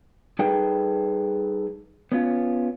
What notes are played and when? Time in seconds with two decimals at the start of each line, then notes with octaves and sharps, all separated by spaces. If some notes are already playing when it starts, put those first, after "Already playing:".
0.39 G3 D#4 G#4 A4 B4 G5
2.12 B3 C#4 F4